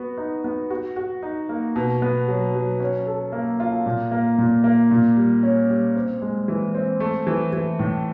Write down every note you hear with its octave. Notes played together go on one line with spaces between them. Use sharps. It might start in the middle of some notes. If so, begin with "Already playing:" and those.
Already playing: B3 F#4
D#4
B3
F#4
F#4
D#4
A#3
B2
B3
F#3
F#3
C#4
A4
A#3
F4
A#2
A#3
A#2
A#3
A#2
G3
C#4
G3
C4
G#3
E3
C4
A3
E3
E3
A2